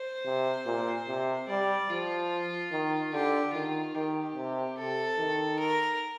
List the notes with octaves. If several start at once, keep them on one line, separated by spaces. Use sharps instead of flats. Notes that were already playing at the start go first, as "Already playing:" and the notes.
Already playing: C5
C3
A#2
C3
G3 D5
F3 F4
D#3
D3 G4
D#3 F4
D#3 G4
C3
C3 A4
D#3
A#4